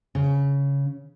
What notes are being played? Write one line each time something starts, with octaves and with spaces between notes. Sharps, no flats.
C#3